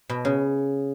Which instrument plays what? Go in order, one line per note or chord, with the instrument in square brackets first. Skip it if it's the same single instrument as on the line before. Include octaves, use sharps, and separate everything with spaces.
[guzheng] B2
C#3